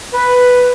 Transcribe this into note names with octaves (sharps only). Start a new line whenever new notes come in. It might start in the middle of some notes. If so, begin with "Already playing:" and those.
B4